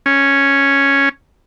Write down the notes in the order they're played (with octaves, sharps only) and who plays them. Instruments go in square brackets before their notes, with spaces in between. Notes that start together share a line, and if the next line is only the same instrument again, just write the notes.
[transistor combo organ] C#4